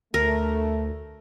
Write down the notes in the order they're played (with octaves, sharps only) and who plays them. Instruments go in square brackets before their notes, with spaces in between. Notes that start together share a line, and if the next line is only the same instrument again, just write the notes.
[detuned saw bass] D2 [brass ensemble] A3 [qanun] A#4